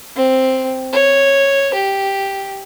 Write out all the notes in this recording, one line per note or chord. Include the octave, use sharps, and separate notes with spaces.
C4
C#5
G4